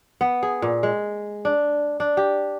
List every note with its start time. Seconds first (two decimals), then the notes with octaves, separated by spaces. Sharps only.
0.21 B3
0.43 G#4
0.62 A#2
0.83 G#3
1.45 D4
2.00 D4
2.17 G4